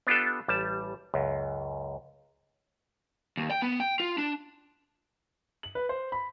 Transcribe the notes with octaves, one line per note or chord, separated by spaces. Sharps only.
B3 D4 F4 G4 A4
A1 G3 A5
C#2 F#2
D#2
G5
B3
G5
F4
D4
F#7
B4
C5
B5